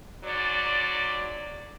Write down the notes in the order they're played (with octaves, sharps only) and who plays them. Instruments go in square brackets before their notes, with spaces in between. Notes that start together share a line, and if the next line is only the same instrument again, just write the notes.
[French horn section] G#2 F#3 D5